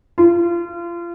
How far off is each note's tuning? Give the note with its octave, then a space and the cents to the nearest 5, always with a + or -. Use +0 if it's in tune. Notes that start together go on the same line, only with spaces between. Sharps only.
F4 -30